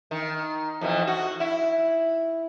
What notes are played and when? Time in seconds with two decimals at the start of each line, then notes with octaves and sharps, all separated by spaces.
0.11 D#3
0.81 F2 B2 E3
1.07 F#4
1.40 E4